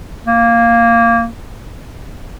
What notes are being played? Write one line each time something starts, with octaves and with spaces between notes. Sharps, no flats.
A#3